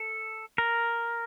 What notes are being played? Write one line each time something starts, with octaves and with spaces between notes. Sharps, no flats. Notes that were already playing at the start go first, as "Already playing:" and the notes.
Already playing: A4
A#4